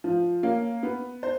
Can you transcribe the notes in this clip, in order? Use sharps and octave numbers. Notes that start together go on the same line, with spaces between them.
F3
A#3 C#4
B3
C5